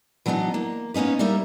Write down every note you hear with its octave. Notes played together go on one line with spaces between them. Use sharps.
E3 F#3 B3 D4 D#4
A#3
A#3 B3 C#4 D#4 B4
G3 A#3 D#4 A#4 E5